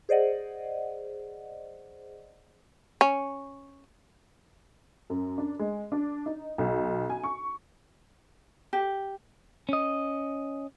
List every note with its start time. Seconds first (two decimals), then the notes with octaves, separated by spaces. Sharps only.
0.09 G#4 C5 D5 D#5 F#5
3.01 C#4
5.10 F#2
5.38 D4
5.59 G#3
5.92 D4
6.26 D#4
6.58 B1
7.10 G#5
7.24 C#6
8.73 G4
9.69 C#4 D#5